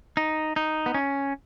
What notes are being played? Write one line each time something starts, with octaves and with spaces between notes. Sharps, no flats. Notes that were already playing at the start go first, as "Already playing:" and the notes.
D#4
D#4
B3
C#4